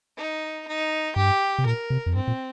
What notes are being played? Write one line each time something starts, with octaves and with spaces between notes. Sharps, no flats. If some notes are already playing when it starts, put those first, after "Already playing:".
D#4
D#4
G2 G4
C3
A#2 A#4
C3
F2
G2 C4
A#2